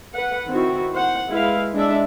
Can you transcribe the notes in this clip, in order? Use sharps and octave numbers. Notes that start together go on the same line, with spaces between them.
B4 F#5
D#3 C4 E4 F#4
C5 F#5
G#3 E4 B4 F5
G#3 D4 E5